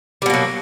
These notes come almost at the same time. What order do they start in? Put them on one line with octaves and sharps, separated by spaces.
G3 B2 A#3 F#3